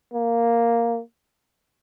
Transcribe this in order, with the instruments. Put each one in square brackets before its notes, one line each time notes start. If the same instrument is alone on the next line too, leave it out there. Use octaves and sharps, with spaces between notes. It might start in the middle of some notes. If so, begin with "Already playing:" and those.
[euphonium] A#3